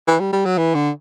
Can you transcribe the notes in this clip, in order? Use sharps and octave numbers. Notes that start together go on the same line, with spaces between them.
E3
G3
G3
F#3
E3
D3